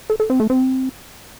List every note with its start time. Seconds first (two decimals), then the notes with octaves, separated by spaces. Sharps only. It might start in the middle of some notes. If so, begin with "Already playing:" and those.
0.10 A4
0.20 A4
0.30 C4
0.40 A3
0.50 C4